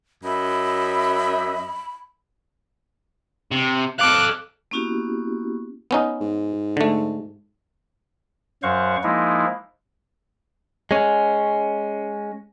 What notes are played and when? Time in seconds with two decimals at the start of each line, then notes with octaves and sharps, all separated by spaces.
0.24 F#2 D#5 E5 B5
3.51 C3
3.99 A4 F5 D6 F#6
4.71 A#3 B3 C#4 E4 F#4 G4
5.91 B3 C#4 D#4
6.21 G#2
6.77 D3 A3
8.63 F#2 F#3 C5 F5 F#5 C#6
9.03 F3 G#3 A#3 D#4 E4
10.91 G#3 C#4